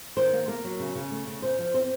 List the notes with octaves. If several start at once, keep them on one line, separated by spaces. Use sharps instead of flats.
D#3 C5
A#3
A#3 A#4
F#3
C#3
C#3
A3
C#3
C#3 C5
F3
C4 C5